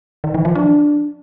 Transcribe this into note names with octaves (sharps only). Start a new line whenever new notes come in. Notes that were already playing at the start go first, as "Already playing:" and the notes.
D#3
E3
F3
D4